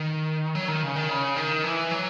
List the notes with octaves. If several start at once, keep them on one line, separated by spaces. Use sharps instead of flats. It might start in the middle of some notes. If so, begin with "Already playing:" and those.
Already playing: D#3
F#3
D#3
C#3
D#3
C#3
D#3
E3
F#3